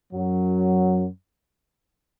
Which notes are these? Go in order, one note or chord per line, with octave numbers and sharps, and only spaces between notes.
F#2 F#3